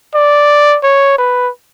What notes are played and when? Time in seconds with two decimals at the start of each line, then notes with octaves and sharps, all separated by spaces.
0.15 D5
0.83 C#5
1.19 B4